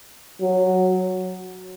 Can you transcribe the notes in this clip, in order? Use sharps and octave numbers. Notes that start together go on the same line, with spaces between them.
F#3